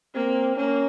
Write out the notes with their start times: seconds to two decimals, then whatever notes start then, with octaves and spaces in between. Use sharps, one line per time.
0.14 A#3 C4
0.57 A#3 C#4